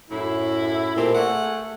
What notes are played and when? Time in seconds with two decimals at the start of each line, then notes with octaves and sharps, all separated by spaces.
0.10 F#2 A2 E4
0.96 A#2 A3 C4 G4
1.13 A3 G#4 F#5